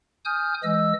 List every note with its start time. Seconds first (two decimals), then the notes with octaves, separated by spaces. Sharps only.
0.25 G#5 D#6 F6 G6
0.63 E3 G#3 D#5 E6